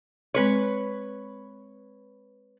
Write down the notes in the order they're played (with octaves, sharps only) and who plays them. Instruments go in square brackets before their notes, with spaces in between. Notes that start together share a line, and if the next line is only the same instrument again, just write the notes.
[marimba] G#3 C4 [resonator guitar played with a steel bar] B4 C#5